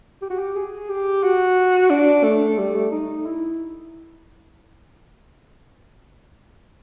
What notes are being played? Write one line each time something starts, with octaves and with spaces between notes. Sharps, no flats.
G4
F#4
G4
G#4
G4
F#4
D4
A3
G3
A3
D#4
E4